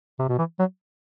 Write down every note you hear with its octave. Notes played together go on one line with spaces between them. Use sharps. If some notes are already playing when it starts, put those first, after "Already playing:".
C3
B2
E3
F#3